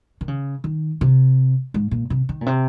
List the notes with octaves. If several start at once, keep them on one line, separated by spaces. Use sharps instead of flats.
D#3
C#3
D#3
C3
G#2
A#2
C3
D#3
A#2
C3